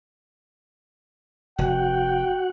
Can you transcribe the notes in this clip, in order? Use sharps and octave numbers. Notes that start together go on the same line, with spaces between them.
F1 F#4 F#5 G5